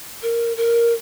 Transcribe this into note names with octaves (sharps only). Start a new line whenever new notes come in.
A#4
A#4